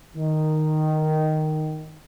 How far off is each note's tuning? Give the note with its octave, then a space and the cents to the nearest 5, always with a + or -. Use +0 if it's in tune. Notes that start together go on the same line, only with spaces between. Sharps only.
D#3 -5